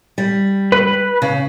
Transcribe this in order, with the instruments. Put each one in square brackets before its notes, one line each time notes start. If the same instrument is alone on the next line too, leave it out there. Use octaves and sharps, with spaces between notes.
[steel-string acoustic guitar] G3
[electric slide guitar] B4
[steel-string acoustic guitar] C#3